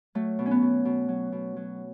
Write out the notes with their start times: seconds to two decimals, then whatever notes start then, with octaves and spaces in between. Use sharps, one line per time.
0.15 F#3 A3
0.39 B2
0.46 C#4
0.51 B3
0.62 B2
0.85 B2
1.09 F#3
1.32 B2
1.56 F#3